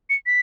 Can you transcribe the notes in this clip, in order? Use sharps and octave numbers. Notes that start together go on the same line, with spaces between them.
C#7
B6